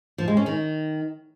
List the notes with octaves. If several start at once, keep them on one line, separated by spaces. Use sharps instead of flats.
F3
G#3
C#4
D#3